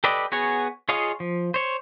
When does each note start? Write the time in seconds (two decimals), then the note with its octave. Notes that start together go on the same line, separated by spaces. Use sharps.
0.04 G4 A4 B4 D5 D#5
0.32 B3 F#4 G#4 C#5 G#5
0.89 F4 G#4 C#5 D#5 F5
1.20 F3
1.54 C5 C#5